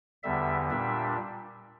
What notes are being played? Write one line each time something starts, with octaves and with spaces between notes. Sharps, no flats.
E2 D3 G3 E5
A#2 G3 D4 E5